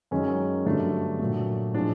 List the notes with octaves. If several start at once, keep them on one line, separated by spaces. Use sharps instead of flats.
F#2 D#3 G#3 C#4
G2 D3 F#3 A3 D4
A#2 F#3 A3
A2 F3 G#3 D4